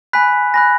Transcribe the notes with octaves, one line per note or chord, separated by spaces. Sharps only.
G#5 B5 F#6 B6
G#5 B5 F#6 A#6